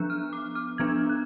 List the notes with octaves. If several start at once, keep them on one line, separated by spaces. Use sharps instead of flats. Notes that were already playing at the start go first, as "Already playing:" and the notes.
Already playing: F3 B3 D4 F#6
F6
D6
F6
F3 B3 D4 G#6
F#6